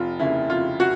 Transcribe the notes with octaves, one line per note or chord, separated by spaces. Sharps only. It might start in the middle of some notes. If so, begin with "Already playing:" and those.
Already playing: F1 F4
D#2 C#3 E4
F1 F4
F#4